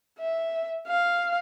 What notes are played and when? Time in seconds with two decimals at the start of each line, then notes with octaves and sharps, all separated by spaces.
0.19 E5
0.88 F5